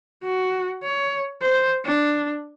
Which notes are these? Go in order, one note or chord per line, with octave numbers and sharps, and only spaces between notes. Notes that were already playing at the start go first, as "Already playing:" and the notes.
F#4
C#5
C5
D4